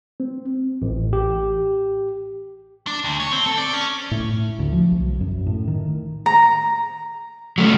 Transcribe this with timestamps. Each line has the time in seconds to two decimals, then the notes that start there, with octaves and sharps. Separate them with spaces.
0.20 C4
0.82 A1
1.13 G4
2.87 D4
3.04 D2
3.20 C#5
3.33 C4
3.46 A4
3.57 D5
3.73 C#4
4.11 A2
4.59 D2
4.72 F3
4.92 B1
5.21 F#2
5.46 A2
5.67 D#3
6.26 A#5
7.58 F#3 A3 C#4